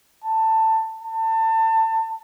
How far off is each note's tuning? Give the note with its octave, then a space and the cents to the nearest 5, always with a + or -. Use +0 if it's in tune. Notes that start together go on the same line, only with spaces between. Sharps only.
A5 +15
A5 +25